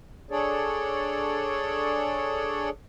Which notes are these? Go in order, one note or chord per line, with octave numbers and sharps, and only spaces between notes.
D4 G#4 A4 C#5 D5